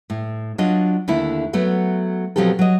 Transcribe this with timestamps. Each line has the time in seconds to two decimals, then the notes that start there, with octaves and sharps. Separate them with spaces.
0.10 A2
0.58 F#3 D4 F4 D#5
1.08 D#2 D3 A3 E4
1.53 F#3 A3 B3
2.36 B2 F3 F#3 C4 G4 A4
2.59 F#3 D#5